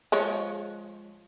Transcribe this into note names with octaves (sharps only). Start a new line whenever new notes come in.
F3 G#3 C#5